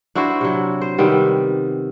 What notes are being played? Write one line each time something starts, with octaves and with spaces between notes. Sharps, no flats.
D4 E4 F#4 C5
C3 F#3
C5
C3 D#3 G3 B3